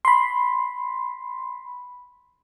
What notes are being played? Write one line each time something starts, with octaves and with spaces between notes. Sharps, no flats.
B5 C6